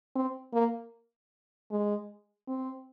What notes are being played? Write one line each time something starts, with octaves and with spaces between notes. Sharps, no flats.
C4
A#3
G#3
C4